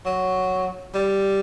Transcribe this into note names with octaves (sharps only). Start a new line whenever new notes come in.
F#3
G3